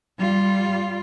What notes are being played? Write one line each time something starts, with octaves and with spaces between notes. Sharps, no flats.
G3 F4